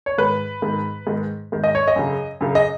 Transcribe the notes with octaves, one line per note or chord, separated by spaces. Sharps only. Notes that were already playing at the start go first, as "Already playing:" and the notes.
C#5
G#2 D#3 B4
G#2 D#3
G#2 D#3
G#2 D#3
D#5
C#5
D#5
F#2 C#3
F#2 C#3
D#5